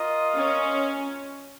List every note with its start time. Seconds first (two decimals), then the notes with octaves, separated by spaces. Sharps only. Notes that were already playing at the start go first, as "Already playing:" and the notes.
Already playing: F4 A#4 D#5
0.38 C#4